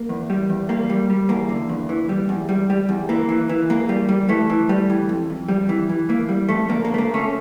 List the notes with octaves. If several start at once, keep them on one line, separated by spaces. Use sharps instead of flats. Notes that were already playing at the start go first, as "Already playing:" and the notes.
Already playing: A#3
E2
G3
E2
G3 A#3
G3
G3
E2 A#3
D3
E2
E3
G3
E2
G3
G3
E2
E3 A#3
E3
E3
E2 A#3
G3
G3
E3 A3
E3
G3
E3
F2
F2
G3
E3
E3
E3 A#3
G3
F2 A3
D3 A#3
D2 A#3
A3
A#3
D2 A3 C#4